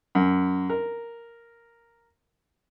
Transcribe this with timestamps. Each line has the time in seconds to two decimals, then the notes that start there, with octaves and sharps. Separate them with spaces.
0.15 F#2
0.70 A#4